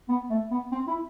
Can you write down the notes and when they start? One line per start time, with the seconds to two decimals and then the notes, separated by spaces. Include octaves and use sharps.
0.08 B3
0.30 A3
0.51 B3
0.72 C4
0.87 E4